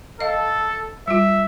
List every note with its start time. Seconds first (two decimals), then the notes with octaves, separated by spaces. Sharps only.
0.20 A4 D#5 F5
1.08 G3 F4 E5